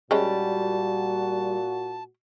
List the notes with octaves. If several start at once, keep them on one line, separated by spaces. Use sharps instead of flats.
A#2 G3 G#3 C#4 F#4 A5